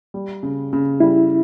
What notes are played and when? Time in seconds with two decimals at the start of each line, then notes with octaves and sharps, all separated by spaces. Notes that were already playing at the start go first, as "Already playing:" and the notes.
0.14 G3
0.43 C#3
0.73 C#3
1.00 G3 E4